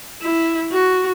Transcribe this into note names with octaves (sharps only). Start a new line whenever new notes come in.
E4
F#4